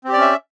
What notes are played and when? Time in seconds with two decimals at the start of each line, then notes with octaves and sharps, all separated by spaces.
0.05 C4
0.09 G4
0.13 D5
0.17 C#4
0.21 E5